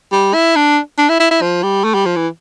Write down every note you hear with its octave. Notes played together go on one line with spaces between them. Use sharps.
G3
E4
D4
D4
E4
E4
E4
F3
G3
A3
G3
F3
E3